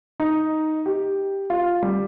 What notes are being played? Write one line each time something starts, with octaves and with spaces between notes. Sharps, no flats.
D#4
G4
F4
G3